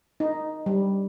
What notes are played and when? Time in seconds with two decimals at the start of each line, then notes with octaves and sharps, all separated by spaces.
0.20 D#4
0.66 G3